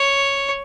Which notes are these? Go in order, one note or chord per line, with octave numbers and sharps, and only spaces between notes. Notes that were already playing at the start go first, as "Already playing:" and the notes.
Already playing: C#5